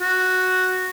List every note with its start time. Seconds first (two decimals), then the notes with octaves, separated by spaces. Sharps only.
0.01 F#4